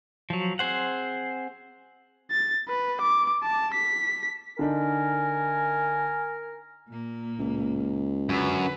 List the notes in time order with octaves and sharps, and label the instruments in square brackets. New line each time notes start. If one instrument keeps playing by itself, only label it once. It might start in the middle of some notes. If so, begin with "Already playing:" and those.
[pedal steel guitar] F3 F#3
C4 G#4 C5 F#5
[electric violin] A6
B4
D6
A5
B6
[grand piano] D3 D4 D#4 [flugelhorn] A#4 [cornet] G#5
[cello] A#2 A#3
[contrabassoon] C#2
[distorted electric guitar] F#2 [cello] D3 B4